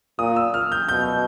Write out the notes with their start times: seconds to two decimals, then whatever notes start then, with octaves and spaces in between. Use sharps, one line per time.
0.18 A#2 D#6
0.36 E6
0.54 F6
0.72 G6
0.89 B2 G6